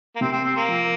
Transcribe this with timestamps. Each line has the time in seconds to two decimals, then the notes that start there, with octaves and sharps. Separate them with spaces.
0.16 A#3
0.21 C3 C4
0.32 C4
0.45 C4
0.57 A#3
0.68 F3